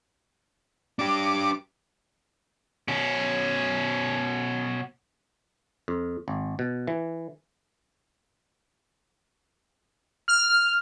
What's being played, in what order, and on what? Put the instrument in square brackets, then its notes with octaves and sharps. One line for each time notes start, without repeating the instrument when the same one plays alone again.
[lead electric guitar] D4 G4 [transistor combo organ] D6
[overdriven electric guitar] B2 C#4
[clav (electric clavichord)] F2
G#1
B2
E3
[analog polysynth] F6